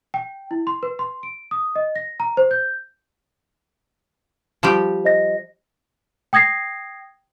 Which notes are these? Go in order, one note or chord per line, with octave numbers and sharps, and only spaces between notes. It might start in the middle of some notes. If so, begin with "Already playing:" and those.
G5
E4
C6
B4
C6
D7
D#6
D#5
A#6
A#5
C5
G6
F3 G3 G4
C5 D#5 A#6
G5 D#6 G#6 A#6 C7